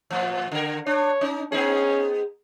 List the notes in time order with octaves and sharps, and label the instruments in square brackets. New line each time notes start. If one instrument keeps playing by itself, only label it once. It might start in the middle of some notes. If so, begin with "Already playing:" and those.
[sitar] A2 F3
D3 A#4
[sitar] D4 [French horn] C#5
[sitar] C#4 D#4
[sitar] B3 D#4 G#4 [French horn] C#4